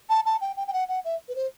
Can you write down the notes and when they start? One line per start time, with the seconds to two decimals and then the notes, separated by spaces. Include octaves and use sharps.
0.09 A5
0.25 A5
0.41 G5
0.56 G5
0.67 G5
0.73 F#5
0.88 F#5
1.04 E5
1.28 B4
1.35 C5